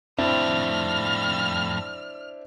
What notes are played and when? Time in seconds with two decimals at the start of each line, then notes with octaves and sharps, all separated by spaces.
0.18 F2 A2 C4 D4 E4 F6